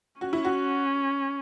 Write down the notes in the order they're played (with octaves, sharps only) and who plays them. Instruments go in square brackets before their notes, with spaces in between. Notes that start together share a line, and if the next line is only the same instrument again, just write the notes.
[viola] C#4 [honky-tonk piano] F#4
[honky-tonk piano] E4
F#4